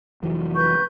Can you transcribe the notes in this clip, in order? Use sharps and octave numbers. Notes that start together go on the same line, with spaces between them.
F1 E3 F#3
B4 C#6 G6